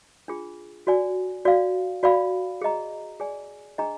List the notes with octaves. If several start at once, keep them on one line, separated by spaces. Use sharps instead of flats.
D4 F4 G#4
F#4 D5 G#5
F#4 D5 F5
F#4 D5 F5 B5
G#4 D#5 A#5
G#4 D5 G#5
D4 G#4 D#5 A#5